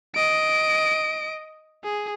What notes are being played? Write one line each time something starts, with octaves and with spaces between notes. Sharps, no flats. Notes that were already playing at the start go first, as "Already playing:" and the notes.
D#5 D7
G#4